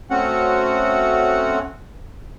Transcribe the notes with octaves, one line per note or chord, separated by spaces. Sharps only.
A3 C4 C#4 F#4 F#5